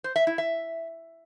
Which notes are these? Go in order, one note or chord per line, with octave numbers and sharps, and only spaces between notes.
C5
E5
E4
E5